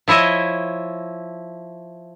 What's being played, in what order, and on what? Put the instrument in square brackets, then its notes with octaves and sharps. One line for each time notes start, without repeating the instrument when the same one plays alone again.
[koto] F3 E4 C#5 D#5 E5